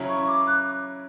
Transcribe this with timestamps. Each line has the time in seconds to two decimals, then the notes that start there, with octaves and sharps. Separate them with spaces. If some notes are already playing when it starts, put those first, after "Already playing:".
Already playing: C#3 F#3 C#4 E4
0.09 C#6
0.28 D6
0.47 F#6